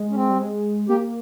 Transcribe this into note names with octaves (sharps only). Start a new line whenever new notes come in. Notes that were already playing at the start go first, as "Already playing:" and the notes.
Already playing: G#3
C#4
C4
G3
G#3
A#3 G4